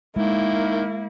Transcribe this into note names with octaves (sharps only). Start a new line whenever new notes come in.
D#3 G#3 A#3 E4